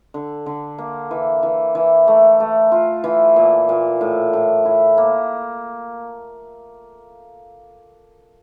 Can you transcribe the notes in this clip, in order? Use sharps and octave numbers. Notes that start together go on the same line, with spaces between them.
D3
D3
A#3
E3
E3
E3
A3
A3
F4
E3
A#2
A#2
A2
A2
E4
A#3